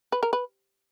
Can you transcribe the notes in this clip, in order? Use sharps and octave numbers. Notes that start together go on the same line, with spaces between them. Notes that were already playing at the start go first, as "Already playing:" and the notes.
B4
A#4
B4